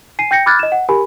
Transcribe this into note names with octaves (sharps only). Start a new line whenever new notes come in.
G#5 C7 D#7
G5 G6 A#6 C#7
B5 D6 F6 F#6 G#6 A6
D#5 E7
F#5
G4 A#4 G#5 B5